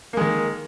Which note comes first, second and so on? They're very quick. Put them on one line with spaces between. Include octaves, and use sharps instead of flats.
A#3 G#3 D#3